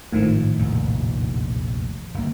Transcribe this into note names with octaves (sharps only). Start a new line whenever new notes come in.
G#1 A2 D#3 F3
F1 A#1 E2
G1 A#3